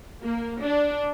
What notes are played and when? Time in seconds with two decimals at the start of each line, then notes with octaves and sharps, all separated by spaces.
0.24 A#3
0.61 D4